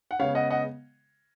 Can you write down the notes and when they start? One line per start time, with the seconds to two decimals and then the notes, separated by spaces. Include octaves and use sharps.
0.11 F#5
0.19 C#3 G#3 B3 C#5 F5
0.35 D#5 F#5
0.51 D#5 F#5